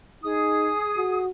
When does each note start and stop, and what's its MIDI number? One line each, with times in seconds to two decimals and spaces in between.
0.23 0.74 63
0.23 1.25 68
0.23 1.25 87
0.97 1.29 66